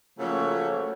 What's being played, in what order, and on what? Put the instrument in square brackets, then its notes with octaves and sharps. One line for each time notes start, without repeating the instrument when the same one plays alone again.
[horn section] C#3 F3 F#3 A3 A#3 C#4